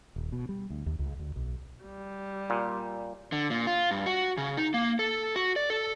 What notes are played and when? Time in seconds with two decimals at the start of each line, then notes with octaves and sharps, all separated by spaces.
0.16 D#1
0.32 B2
0.49 G3
0.70 D2
0.86 D#2
0.99 C#2
1.19 D2
1.36 B1
1.84 G3
2.50 A#2
3.32 D3
3.50 A#2
3.67 F4
3.91 G2
4.06 F#4
4.37 C#3
4.57 D#4
4.74 A#3
4.99 A4
5.36 F#4
5.56 D5
5.70 A4